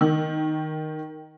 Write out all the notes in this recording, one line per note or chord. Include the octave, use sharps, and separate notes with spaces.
D#3